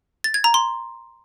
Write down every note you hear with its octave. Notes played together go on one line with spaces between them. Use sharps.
A6
G#6
A#5
C6